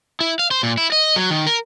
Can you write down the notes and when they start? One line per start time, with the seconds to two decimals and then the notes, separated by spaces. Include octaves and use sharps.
0.21 E4
0.39 F5
0.51 C5
0.63 A#2
0.78 E4
0.92 D#5
1.16 F#3
1.30 D#3
1.47 A#4